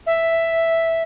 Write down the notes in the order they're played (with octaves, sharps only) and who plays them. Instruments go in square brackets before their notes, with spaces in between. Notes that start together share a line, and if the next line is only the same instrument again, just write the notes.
[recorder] E5